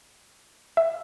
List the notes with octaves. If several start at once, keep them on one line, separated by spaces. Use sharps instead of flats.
E5